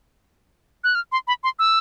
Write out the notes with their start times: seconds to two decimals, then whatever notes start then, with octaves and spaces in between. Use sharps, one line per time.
0.84 F#6
0.95 F6
1.12 C6
1.27 B5
1.44 C6
1.59 E6